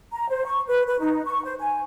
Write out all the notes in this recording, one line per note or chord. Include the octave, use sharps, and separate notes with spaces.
A#5
C5
C#6
B4
B4
D#4
C#6
C5
G#5